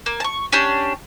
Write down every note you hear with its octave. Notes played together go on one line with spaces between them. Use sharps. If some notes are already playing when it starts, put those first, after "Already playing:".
A#3
A5 C#6
C#4 D4 G4